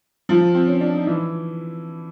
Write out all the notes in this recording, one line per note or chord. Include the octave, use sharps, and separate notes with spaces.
F3 F4
C4
C#4
D4
D#4
E3 E4